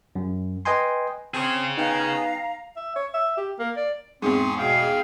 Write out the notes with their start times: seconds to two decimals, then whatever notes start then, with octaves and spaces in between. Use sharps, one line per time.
0.15 F#2
0.65 B4 D#5 G5 G#5 C6
1.34 C4 G#4 C#5
1.78 B3 D#4 F5 G5 G#5 A#5
2.76 E5
2.96 C#5
3.14 E5
3.37 G4
3.59 A#3
3.77 D5
4.22 E2 G#2 C4 C6 C#6 D#6
4.58 B2 G#4 F5 G5